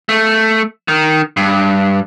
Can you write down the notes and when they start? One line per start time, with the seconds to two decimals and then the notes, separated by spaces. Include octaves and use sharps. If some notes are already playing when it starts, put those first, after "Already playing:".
0.09 A3
0.88 D#3
1.37 G2